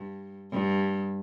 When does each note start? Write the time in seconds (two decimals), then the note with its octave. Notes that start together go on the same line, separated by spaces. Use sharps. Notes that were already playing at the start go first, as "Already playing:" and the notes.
Already playing: G2
0.51 G2